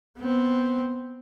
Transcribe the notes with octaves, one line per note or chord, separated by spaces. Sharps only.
B3 C4